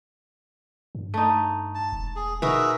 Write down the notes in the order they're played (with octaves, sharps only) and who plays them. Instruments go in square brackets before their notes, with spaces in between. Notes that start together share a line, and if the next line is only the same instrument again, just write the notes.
[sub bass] G2
[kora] A3 D#4
[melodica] A5
[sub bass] E1
[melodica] G#4
[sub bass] B2 [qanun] D#4 A#4 B4 [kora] F#4 [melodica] G#4 E5